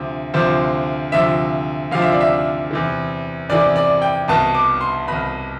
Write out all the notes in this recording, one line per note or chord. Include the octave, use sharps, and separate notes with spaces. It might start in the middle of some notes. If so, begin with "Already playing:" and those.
Already playing: D2 C3 F3
D2 C3 F3 C5
D2 C3 F3 E5
D2 C3 F3 F5
E5
D5
E5
E2 C3 E3
E2 C3 E3 D5
D5
G5
C2 B2 A5
D6
C6
C2 B2 B5